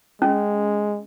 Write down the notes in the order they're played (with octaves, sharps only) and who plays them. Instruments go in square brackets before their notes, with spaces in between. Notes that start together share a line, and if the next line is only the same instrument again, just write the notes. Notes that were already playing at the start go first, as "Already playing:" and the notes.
[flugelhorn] G#3 [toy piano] C#4